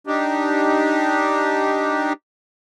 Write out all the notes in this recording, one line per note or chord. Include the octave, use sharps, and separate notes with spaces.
D4 D#4 G4